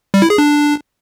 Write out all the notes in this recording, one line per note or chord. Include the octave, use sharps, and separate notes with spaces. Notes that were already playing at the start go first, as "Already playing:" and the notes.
G3
E4
G#4
D4